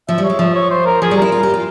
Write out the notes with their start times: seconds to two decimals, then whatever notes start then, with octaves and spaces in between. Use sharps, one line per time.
0.08 F3 E5
0.18 G3
0.24 C#5
0.30 G#3
0.39 F3 E5
0.55 C#5
0.70 C5
0.86 A#4
1.02 F3 G#4
1.11 G3
1.17 E4 A#4
1.32 F4
1.43 G4
1.54 F4